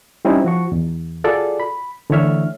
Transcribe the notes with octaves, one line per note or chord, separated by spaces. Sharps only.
G3 C4 C#4 D#4 E4
F3 F#4 C#6
E2
F4 F#4 G#4 A4 D5
B5
D3 E3 A3 C#5 E5 F6